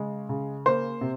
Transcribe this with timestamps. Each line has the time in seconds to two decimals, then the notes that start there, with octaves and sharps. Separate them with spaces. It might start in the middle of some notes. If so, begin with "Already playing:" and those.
Already playing: C#3 G#3
0.29 C#3
0.66 A#3 C5
1.01 C3